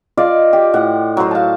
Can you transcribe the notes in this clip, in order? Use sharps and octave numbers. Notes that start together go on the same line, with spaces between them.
F4 D5 D#5 F5
G4
A2 F#5
F#3 C5
F5 A5